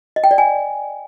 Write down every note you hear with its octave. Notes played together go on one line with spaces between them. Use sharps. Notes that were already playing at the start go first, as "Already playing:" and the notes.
D#5
G5
D5
G#5